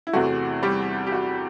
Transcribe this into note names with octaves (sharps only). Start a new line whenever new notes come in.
E4
E2 C3 E3 A3 F#4
G3 G4
G4
F#4